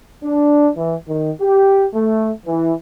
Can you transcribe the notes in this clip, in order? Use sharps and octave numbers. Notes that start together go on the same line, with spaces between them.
D4
E3
D#3
G4
A3
E3